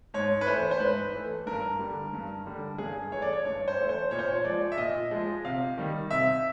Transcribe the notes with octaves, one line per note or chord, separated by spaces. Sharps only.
G#2 C#5
B4
E3 A3 C5
C5
G#2 B4
E3 A3
G2 A#4
D3 G3
G2
D3 G3
G2 G#4
E3 A3 C#5
D5
C#5
G2 C#5
C5
E3 A3
C5
A#2 C#5
C5
C#5
F3 G#3 D5
E5
A#2 D#5
F3 G#3
C3 F5
D#3 G3
C3 E5